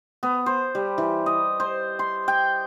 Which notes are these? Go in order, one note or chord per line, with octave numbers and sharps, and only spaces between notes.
B3
C5
G3
E3
D#5
C5
C6
G5